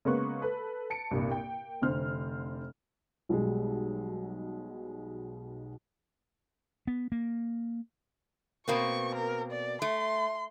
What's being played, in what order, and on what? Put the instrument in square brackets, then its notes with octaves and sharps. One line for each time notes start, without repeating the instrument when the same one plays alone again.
[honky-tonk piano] C#3 G#3 A#3 B3 C#6 F#6
A4 B4 B5
A5 C#7 D7
C2 G2 A#2
A#3 G5
F1 D3 C5 F6
[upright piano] B1 B2 G3 G#3
[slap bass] B3
A#3
[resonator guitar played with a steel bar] B2 A#3 C4 [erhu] C#6
[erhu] A#4
D5
[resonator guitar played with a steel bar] A3 [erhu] C6